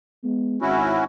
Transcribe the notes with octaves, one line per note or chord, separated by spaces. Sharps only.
G#3 B3
G#1 C#4 E4 F#4